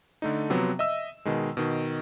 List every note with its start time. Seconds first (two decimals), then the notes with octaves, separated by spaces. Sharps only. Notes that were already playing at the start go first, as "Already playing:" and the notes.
0.22 D3 A3 D#4
0.50 C3 F3 F#3 B3 C4
0.79 D#5 E5 E6
1.25 B2 D#3 G#3
1.57 B2 D#3